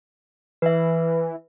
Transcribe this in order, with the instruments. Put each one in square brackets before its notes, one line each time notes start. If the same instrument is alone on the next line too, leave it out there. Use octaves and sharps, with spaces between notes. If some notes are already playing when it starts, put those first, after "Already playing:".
[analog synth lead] E3 [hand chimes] B4 E5